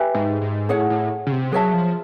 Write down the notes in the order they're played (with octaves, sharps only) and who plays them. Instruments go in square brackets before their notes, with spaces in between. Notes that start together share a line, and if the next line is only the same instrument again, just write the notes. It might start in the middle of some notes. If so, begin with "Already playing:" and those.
Already playing: [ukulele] G4 B4 E5 G#5
[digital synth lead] G#2
G#2
[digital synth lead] A2 [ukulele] G#4 C#5 F#5
[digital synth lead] A2
C#3
C3
[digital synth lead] F#3 [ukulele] G#4 C#5 E5 A5
[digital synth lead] F3